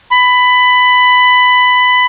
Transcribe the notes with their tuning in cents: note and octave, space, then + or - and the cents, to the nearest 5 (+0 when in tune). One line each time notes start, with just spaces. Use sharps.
B5 +15